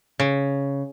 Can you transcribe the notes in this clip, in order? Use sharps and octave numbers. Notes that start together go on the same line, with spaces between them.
C#3